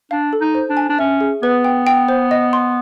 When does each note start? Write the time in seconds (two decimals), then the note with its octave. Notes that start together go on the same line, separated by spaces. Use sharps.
0.11 D4 F5
0.33 A4
0.41 D#4
0.55 C5
0.70 D4
0.77 G#5
0.89 D4
0.99 C#4 E5
1.21 G#4
1.42 B3 B4
1.64 G5
1.87 G5
2.09 C5
2.31 D#5
2.53 C6